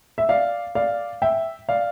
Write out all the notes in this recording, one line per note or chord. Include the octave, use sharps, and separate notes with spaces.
E5
D5 F5
D5 F5
E5 G5
D5 F5